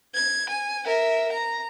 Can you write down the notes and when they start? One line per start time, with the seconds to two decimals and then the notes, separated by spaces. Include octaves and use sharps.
0.15 G#6
0.49 G#5
0.85 A#4 E5
1.32 A#5